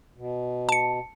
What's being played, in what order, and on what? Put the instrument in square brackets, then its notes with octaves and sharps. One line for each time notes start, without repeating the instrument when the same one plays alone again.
[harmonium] B2
[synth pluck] A5 C#7